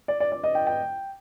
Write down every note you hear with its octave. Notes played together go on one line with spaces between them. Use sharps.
D5
D5
D5
D#5
G5
G5